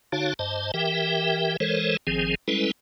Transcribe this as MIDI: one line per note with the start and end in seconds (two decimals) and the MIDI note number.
0.12 0.34 50
0.12 0.34 63
0.12 0.34 66
0.12 0.34 73
0.12 0.34 77
0.12 0.34 81
0.39 0.71 43
0.39 0.71 72
0.39 0.71 75
0.39 0.71 81
0.74 1.57 52
0.74 1.57 67
0.74 1.57 70
0.74 1.57 76
0.74 1.57 79
1.60 1.97 52
1.60 1.97 56
1.60 1.97 69
1.60 1.97 70
1.60 1.97 72
1.60 1.97 73
2.07 2.35 32
2.07 2.35 51
2.07 2.35 53
2.07 2.35 60
2.07 2.35 68
2.48 2.71 55
2.48 2.71 56
2.48 2.71 61
2.48 2.71 64
2.48 2.71 69
2.48 2.71 71